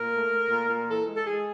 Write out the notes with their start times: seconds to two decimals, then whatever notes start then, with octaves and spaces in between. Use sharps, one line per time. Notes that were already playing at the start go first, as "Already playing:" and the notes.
Already playing: A#2 A#4
0.13 A3
0.31 A3
0.50 A#2
0.69 A#2
0.87 E3 A4
1.06 G#3
1.15 A4
1.25 G#3 G#4